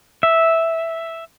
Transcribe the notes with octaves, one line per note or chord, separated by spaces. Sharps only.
E5